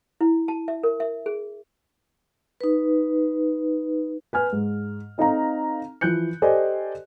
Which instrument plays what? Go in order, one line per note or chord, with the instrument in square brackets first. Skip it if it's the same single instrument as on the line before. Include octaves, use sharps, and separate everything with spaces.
[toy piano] E4
A5
E5
A#4
E5
G#4
[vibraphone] D#4 B4
[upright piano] B4 G#5 F6
G#2
C4 D#4 A4 F5 A#5
E3 F3 F#6 G6 C#7
G4 A4 C5 D5 D#5 G#5